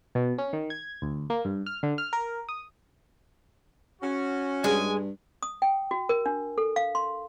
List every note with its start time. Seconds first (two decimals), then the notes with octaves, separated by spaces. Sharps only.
0.15 B2
0.38 C#4
0.53 D#3
0.70 G#6
1.02 D2
1.30 A#3
1.45 G2
1.66 F6
1.83 D3
1.98 F6
2.13 A#4
2.49 D#6
4.02 C#4 F#4
4.64 G2 G#3 G#5
5.43 D#6
5.62 G5
5.91 F#4
6.09 A#4
6.26 D4
6.58 A4
6.76 F5
6.95 C6